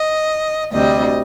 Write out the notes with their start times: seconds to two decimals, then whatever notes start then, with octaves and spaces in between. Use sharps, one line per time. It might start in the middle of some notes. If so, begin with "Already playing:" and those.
Already playing: D#5
0.72 D2 C3 G3 D#5